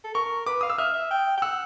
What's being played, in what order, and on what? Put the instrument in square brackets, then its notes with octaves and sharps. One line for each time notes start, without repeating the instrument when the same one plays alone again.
[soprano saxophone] A4
[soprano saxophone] A#4 [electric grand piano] C#6
[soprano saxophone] B4 [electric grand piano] D6
[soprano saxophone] F5 [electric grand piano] D#6
[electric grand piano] E6
[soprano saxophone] E5 [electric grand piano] F6
[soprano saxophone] E5
G5
G5
[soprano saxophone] F#5 [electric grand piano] E6